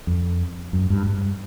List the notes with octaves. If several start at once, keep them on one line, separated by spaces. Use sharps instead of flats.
F2
F#2
G2
G2